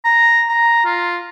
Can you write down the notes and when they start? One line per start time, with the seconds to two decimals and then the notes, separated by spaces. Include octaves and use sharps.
0.05 A#5
0.49 A#5
0.85 F4